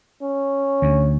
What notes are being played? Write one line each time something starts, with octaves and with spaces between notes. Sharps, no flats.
C#4
D2